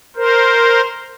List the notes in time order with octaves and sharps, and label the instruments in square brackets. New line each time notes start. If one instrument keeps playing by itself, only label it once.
[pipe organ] A#4 C5